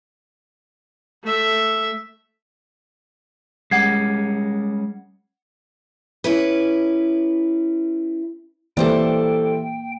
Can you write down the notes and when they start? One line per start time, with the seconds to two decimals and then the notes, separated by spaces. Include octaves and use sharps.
1.24 A3 E5
3.71 G3 G#3 C#4 F#5 G#6 C7
6.24 C#4 E4 B4
8.77 E3 G3 A#3 A4 C5 D5 G5